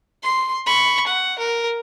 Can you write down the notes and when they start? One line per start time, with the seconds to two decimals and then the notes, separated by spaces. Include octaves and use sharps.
0.23 C6
0.66 B5 C#6
1.07 F#5
1.39 A#4